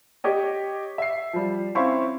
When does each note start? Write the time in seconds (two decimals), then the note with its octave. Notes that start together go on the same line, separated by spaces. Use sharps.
0.24 G4 C#5 D#5
0.98 E5 C7
1.33 F3 G3
1.75 C4 C#4 E4 F5 C6 C#6